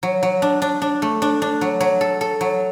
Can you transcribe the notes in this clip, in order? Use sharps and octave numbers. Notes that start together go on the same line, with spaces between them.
F#3
F#3
D4
D4
D4
A3
D4
D4
F#3
F#3
A4
A4
F#3